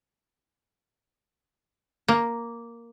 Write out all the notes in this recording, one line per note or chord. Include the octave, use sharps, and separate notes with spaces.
A#3